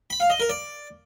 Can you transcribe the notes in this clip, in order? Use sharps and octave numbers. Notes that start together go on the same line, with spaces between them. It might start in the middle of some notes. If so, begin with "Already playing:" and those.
B5
F5
D#5
A#4
D5